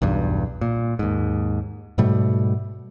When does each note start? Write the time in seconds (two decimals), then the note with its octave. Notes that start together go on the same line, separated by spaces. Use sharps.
0.02 B1 E2 G2
0.61 A#2
0.99 D#2 G#2
1.98 G#2 B2 G3 A3